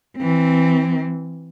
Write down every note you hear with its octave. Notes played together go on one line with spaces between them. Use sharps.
E3 C4